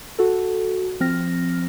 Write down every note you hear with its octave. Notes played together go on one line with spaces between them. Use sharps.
F#4 A4
F3 C4 F6 A#6